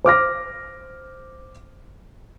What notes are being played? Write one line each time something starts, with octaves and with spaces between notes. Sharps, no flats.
C5 D6 F6 A#6